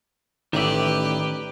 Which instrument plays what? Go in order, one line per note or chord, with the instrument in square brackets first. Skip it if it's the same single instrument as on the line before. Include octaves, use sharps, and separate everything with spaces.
[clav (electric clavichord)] A1 E5 [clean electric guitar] D#3 D5 [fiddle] G4 B4